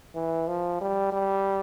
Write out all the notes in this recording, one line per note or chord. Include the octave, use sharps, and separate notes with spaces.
E3
F3
G3
G3